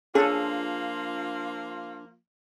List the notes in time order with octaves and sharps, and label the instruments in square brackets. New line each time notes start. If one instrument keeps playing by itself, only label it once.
[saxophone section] F3 A#3 F4 [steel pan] C#4 A4 [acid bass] D4 [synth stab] G#4